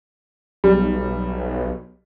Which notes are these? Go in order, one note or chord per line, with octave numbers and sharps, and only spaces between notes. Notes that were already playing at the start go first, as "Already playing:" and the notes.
B1 G3